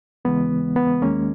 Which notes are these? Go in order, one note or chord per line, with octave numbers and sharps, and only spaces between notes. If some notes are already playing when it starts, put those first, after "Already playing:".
D#2 C#3 E3 G#3 B3
B3
D#2 D#3 G#3 A#3 C#4